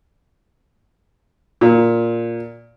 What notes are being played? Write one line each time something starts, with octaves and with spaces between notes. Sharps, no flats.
A#2